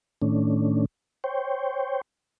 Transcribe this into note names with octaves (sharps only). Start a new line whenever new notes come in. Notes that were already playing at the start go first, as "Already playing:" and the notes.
A2 D#3 A3 C#4 D4
C5 C#5 G5